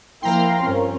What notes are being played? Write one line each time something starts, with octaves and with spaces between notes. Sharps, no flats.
F3 A#3 E4 F5 G5 A#5 C6
G2 C4 C#4 F4 A#4